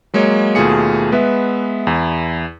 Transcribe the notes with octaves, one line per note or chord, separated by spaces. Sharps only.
F#3 G#3 A#3 C#5 D#5
D#2 B2 A3 F4 G#4 C#7
G#3 B3 B4 E5
E2 E4